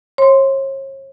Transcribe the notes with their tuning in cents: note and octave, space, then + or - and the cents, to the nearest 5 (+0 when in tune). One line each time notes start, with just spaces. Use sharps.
C#5 -40 C6 -5